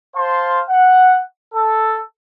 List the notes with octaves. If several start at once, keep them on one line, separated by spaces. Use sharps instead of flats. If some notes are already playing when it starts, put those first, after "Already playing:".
C5 F5 A5 C6
F#5
A4